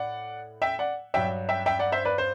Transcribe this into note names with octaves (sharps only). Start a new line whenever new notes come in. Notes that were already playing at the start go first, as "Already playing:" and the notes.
Already playing: A2 D5 F#5
E5 G5
D5 F#5
G2 F#3 E5 G5
E5 G5
E5 G5
D5 F#5
C5 E5
B4 D5
C5